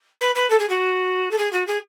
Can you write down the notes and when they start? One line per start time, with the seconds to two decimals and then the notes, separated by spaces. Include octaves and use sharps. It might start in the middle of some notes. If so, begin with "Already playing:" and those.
0.21 B4
0.35 B4
0.50 A4
0.59 G#4
0.69 F#4
1.31 A4
1.38 G#4
1.53 F#4
1.67 G#4